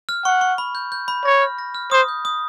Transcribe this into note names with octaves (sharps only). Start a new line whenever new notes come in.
F6
F#5 C#6
C#6
B5
G6
G6
B5
C#5 A#6
F6
A#6
F6
C5 D#6
G6
D#6